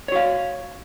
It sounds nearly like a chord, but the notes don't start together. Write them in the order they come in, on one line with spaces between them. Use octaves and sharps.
C#5 F#4 F5